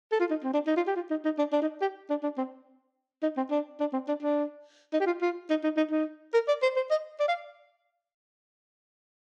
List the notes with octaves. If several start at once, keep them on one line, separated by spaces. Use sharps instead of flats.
A4
F4
D#4
C4
D4
D#4
F4
G4
F4
D#4
D#4
D4
D4
D#4
G4
D4
D4
C4
D#4
C4
D4
D4
C4
D4
D4
D#4
G4
F4
F4
D#4
D#4
D#4
D#4
A#4
D5
C5
C5
D#5
D5
F5